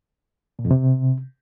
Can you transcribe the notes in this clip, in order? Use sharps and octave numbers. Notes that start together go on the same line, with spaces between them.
A#2
F2
C3